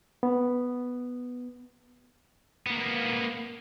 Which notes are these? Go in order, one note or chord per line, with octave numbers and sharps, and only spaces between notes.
B3
A#3 B3